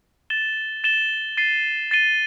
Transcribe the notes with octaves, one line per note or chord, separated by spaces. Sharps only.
A6 E7 G7
A6 E7 G7
A6 C7 D#7 G7
A6 C7 D#7 G7